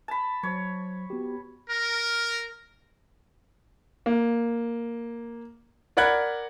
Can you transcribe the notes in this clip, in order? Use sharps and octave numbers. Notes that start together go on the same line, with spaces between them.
A5 B5
F#3 C5 C#5
B3 F#4 G4
A#4
A#3
A#4 D5 F#5 B5 F#6 G#6